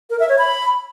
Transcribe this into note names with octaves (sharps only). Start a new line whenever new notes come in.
A#4
E5
C#5
B5